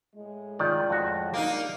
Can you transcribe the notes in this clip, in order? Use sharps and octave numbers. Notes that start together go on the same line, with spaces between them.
A2 G#3
D#3 F4 D5
F2 F#4
G3 A#3 D4 D#4